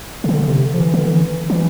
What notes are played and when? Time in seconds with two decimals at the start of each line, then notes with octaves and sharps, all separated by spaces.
0.24 C3
0.29 D3
0.47 C3
0.66 D3
0.74 F3
0.80 E3
0.94 D3
1.08 E3
1.50 E3